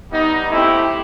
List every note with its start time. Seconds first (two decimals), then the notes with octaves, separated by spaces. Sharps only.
0.10 G3 B3 D#4
0.50 A3 C4 E4 G4